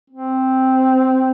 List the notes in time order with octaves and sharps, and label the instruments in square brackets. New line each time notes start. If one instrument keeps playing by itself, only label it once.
[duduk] C4